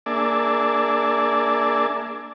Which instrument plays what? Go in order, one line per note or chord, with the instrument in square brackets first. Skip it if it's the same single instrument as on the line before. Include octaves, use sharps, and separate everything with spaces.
[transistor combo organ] A#3 D4 G#4 D5 E5 A5